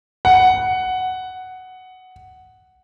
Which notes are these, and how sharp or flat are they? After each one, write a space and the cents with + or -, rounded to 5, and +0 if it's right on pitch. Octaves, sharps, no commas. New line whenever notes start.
F#5 +5